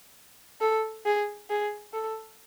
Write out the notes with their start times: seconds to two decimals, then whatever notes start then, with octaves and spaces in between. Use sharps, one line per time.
0.61 A4
1.05 G#4
1.50 G#4
1.94 A4